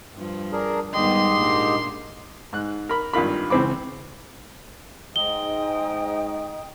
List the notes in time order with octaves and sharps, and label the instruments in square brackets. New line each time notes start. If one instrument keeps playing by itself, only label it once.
[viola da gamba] G2 F3
[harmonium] D4 G#4 A#4
[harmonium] G#2 G4 D#5 [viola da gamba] D#3 G3 B3 [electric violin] C6
[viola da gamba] A#2 A#3 D4
[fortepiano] G#2 F#6
A#4 B5
G#1 G2 F4 A#4 B5
C#2 E3 C4 B5 D6
[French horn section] G#2 [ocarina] D#5 [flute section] G5 A#5 D#6 [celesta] G7